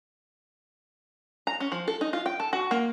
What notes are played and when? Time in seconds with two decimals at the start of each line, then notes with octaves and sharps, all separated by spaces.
1.47 A#5
1.60 C#4
1.72 F3
1.88 A4
2.01 D#4
2.13 F4
2.26 G5
2.40 A4
2.53 F#4
2.71 A#3